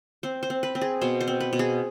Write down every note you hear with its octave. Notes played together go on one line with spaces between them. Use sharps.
C4 C5
C5
C4
B4
C4
G#4
B2 C5
C5
C4
B4
B2
G#4